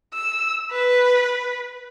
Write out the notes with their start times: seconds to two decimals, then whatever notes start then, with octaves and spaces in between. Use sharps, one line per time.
0.14 E6
0.72 B4